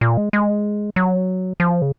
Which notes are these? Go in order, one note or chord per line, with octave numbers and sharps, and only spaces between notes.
A#2
G#3
G#3
F#3
F3
C#3